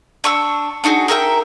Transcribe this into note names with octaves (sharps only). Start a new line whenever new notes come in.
D4 C#6 E6
D4 D#4 F#4 G#4
G#4 A#4 E5 G5